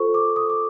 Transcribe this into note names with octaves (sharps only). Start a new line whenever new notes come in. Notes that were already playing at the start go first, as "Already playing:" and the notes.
Already playing: F4 A4 C5 C#6
D6
D#6
D6